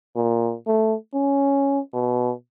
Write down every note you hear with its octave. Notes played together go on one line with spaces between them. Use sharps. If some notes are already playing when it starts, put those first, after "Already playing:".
A#2
A3
C#4
B2